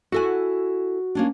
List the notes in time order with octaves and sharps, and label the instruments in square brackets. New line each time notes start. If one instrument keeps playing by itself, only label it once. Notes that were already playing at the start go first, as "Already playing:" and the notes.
[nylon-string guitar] E4 A4 G#5 [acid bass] F#4
[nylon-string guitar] A#3 C#4 D4